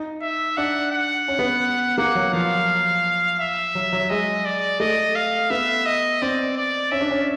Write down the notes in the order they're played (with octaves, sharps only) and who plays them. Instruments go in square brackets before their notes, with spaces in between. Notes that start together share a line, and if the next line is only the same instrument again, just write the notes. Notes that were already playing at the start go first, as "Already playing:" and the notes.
Already playing: [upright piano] D#4
[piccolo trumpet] E5
[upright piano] D4 [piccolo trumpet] F#5
[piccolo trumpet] F#5
[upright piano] C#4
B3
[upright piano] A#3 [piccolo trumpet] F#5
[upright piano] F#3
[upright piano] F3 [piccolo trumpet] F5
[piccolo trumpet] E5
[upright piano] F#3
F#3
[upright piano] G#3 [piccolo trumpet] D#5
[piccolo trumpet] D5
[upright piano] A3 [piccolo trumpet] D#5
[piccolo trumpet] F5
[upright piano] B3 [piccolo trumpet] E5
[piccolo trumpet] D#5
[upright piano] C4 [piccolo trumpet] D5
[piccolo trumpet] D5
[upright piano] C#4 [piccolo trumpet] E5
[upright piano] D4
C#4